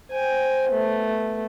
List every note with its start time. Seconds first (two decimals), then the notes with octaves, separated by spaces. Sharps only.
0.11 C5 G5 G#5
0.69 A3 B3